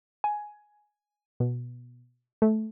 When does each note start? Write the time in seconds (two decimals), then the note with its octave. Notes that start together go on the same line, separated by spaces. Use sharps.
0.24 G#5
1.40 B2
2.42 A3